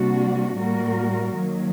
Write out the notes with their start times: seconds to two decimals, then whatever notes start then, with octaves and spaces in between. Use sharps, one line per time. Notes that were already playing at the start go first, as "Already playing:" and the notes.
Already playing: C3 G3 A#3 D4 F#4
0.59 A2 G3 A#3 F#4 A#4
1.36 D#3 F#3 A#3